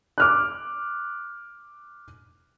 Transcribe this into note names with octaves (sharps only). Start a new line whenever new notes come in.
D6 F6 F#6